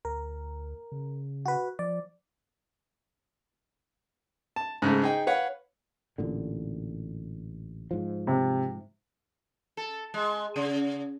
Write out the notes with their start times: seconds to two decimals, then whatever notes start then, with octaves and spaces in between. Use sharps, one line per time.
0.05 D2 A#4
0.92 C#3
1.46 F#4 B4
1.79 F3 D5
4.56 A5
4.82 G#2 C#3 G#3 A3
5.02 D#4 G#4 G5
5.27 B4 C#5 F5 F#5
6.18 A1 A#2 D3
7.91 G#2 F3
8.27 C3
9.77 A4
10.14 G#3
10.56 C#3